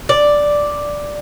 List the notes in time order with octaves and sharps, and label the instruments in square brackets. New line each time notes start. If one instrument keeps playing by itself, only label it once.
[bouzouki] D5